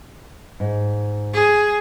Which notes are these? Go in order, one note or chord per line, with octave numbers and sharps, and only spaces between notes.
G#2
G#4